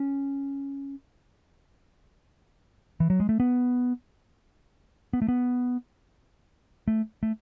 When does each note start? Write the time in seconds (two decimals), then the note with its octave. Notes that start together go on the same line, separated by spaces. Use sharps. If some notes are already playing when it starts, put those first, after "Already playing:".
Already playing: C#4
3.00 E3
3.10 F#3
3.20 G#3
3.29 A3
3.40 B3
5.13 B3
5.22 A3
5.28 B3
6.88 A3
7.23 A3